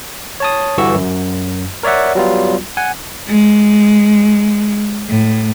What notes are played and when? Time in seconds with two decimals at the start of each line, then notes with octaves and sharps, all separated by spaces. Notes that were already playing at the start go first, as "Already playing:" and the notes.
0.40 C#5 A5 D#6
0.78 G2 D3 E3 F#4 C#6 E6
0.95 F#2
1.83 A#4 C#5 D5 E5 F#5
2.15 F#3 G3 B3 F4
2.77 F#5 G#5
3.27 G#3
5.08 A2